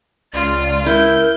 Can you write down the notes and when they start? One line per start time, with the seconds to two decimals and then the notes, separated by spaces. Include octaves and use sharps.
0.34 C#2 F4 D5
0.86 E4 A#4 G6